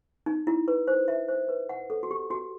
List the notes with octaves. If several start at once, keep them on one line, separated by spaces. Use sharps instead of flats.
D#4
E4
B4
C5
E5
C5
B4
F#5
A4
F#4
G4
F#4